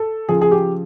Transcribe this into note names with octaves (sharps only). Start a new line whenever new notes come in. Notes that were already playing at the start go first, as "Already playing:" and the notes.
Already playing: A4
C#3 F3 G#4
G#4
G4